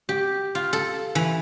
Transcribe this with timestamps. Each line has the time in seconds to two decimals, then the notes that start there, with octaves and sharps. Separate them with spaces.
0.09 G4
0.55 F4
0.73 A4
1.15 E3